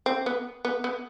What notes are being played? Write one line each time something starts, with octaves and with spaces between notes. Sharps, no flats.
C4
B3
B3
B3